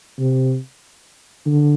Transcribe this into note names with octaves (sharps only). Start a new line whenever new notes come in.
C3
D3